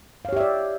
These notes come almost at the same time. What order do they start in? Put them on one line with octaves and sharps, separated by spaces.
F5 C#5 G4 E5 D5